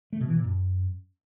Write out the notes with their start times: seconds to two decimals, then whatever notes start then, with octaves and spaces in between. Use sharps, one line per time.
0.13 A3
0.20 B2
0.28 E3
0.36 A#2
0.44 F#2